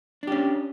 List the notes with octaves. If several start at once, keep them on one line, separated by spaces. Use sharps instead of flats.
C#4 D4 G4